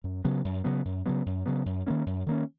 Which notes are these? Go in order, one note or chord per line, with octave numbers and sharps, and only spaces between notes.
F#2
C#3 F#3 B3
F#2
C#3 F#3 B3
F#2
C#3 F#3 B3
F#2
C#3 F#3 B3
F#2
D#3 A#3 C#4
F#2
D#3 A#3 C#4